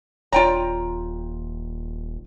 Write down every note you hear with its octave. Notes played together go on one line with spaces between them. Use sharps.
D#1 F4 C#5 D5 G5 A#5